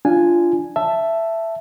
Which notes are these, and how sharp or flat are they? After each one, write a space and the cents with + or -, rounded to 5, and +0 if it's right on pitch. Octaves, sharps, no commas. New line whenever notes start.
D4 +0 F4 -15 G#5 +0
E5 +10 A5 +0